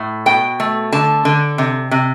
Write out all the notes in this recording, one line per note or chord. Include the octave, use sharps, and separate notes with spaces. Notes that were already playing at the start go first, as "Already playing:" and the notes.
Already playing: A2
B2 G5
A3
D3 A5
D3
C3
C3